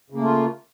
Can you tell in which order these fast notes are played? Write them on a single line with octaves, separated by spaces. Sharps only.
C#3 A#3 A3 F4